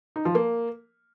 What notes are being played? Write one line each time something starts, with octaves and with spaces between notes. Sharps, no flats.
D#4
F3
A#3